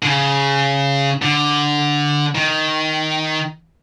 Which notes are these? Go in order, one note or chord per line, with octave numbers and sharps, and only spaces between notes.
D3
C#3
D3
D#3